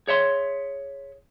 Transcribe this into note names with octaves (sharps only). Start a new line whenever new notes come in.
G#4 C#5 E5 C6